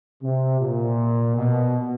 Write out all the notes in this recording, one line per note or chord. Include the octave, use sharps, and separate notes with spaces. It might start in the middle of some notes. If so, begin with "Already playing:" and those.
C3
A#2
B2